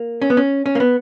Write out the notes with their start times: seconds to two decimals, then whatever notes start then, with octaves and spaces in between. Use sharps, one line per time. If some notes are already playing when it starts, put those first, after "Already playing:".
Already playing: A#3
0.22 C#4
0.30 B3
0.37 C#4
0.66 C#4
0.75 A#3
0.80 B3